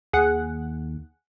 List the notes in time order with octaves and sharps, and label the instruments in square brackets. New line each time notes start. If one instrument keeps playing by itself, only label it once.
[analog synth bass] D#2 [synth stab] G#4 F#5